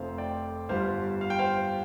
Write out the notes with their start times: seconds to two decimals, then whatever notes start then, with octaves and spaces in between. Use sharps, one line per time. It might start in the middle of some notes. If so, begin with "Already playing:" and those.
Already playing: F1 F2 F3 A3 C5 F5
0.18 D5 G5
0.69 G1 G2 G3 C5 F5
1.21 F5
1.30 G5
1.39 C5 F5